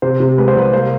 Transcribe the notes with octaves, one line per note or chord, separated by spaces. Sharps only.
C3 C5
C3
G#3 B4
C5
C2 B4
A#3 C5